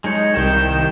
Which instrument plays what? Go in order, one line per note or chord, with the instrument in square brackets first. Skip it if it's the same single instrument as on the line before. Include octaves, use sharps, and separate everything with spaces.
[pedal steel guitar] G#3 D#4 C#5
[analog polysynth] C2 D#3 E7 [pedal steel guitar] G5